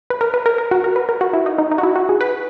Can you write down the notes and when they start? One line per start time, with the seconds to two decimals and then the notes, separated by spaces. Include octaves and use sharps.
0.10 B4
0.21 A#4
0.34 B4
0.46 A#4
0.58 A#4
0.71 F#4
0.84 A#4
0.96 B4
1.09 A#4
1.21 F#4
1.33 E4
1.46 D#4
1.58 D#4
1.71 D#4
1.78 F#4
1.83 E4
1.96 F#4
2.09 G#4
2.21 B4